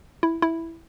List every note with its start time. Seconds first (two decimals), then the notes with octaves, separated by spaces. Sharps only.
0.23 E4
0.42 E4